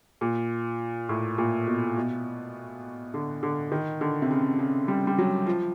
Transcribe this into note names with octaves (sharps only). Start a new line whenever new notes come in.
A#2
A2
A#2
B2
B2
D3
D3
D#3
D3
C3
C#3
C#3
G3
G3
F#3
F3